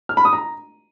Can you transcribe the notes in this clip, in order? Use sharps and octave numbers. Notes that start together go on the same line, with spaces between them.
F6
B5
D#6
A#5